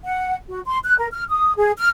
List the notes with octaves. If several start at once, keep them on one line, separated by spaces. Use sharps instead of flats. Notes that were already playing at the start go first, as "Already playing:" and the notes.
F#5
F#4
C6
F#6
A#4
F6
D#6
G#4
F6